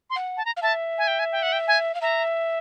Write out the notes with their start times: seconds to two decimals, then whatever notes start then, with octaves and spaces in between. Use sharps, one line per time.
0.10 C6
0.16 F#5
0.37 A5
0.45 A#5
0.57 F5
0.62 E5 A5
0.98 G#5
1.08 G5
1.19 G#5
1.32 G5
1.43 F#5
1.53 G5
1.68 G#5
1.95 F5
2.01 E5 A#5